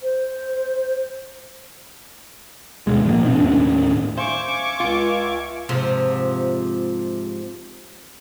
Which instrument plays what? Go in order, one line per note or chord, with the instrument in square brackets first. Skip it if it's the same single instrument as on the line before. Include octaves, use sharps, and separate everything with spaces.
[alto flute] C5
[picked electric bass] D#2 B2 G#3
A#2 F3 A3 A#3
B2 F3 C4 D4
D#2 A2 C#4 D4
[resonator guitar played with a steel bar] C5 [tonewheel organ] E5 F5 G#5 [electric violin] C#6 D6
[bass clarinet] C#2 [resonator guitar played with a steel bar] F4
[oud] G#2 C3 F3